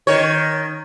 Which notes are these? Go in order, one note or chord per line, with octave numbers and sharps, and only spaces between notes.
D#3 C#5